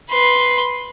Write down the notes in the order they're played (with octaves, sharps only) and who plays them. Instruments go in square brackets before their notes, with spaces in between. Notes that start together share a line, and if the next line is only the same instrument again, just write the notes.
[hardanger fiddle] B4 C6